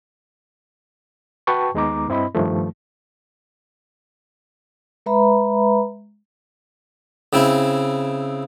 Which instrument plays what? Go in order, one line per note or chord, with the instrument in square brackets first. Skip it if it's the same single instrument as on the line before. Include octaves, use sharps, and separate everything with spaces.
[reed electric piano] F#4 B4 G5 A5 C#6
D#2 G#3 B3 D#4 A#5 D6
G2 C4 E4 D#5 B5
G2 D#3 F3 A3
[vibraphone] G#3 B4 E5 A#5 B5
[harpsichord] C#3 C4 E4